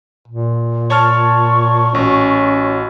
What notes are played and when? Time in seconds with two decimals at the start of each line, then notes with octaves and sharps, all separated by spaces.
0.28 A#2
0.90 C#5 A5 C#6 F6
1.95 A1 C#4 F#4